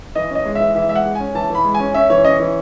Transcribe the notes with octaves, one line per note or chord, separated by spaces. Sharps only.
E3 D#5
C#4
D#5
G#3
E5
E3
E3 E5
G#3 E5
F#5
G#3
C#4 G#5
E3 A5
E3 B5
G#3
G#5
C#4
C#4 E5
E3 C#5
C#4 D#5
E3